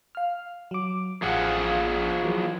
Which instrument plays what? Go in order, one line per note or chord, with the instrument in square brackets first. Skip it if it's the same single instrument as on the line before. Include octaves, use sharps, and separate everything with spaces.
[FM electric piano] F5 F6
F#3 D6
[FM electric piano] A1 F5 [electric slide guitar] F3 G#4 F#5
[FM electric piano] E3 F#3 A#3